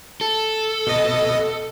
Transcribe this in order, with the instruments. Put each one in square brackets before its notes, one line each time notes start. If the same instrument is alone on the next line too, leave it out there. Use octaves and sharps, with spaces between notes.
[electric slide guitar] A4
[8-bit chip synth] B2 D#5